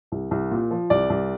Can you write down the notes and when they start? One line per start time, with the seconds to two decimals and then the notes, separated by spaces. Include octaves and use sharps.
0.12 C2
0.31 C2
0.51 A#2
0.71 F3
0.90 C2 D5
1.10 C2